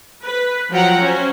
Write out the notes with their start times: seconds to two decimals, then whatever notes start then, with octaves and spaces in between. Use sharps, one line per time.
0.24 B4
0.71 F3 F#3 F#5 G5 A#5
1.02 C#4 C5